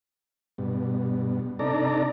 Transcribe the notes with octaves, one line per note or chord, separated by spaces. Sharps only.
G2 B2
C3 D4 D#4 A4 D5 A#5